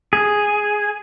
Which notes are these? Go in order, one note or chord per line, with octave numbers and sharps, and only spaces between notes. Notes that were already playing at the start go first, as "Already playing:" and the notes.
G#4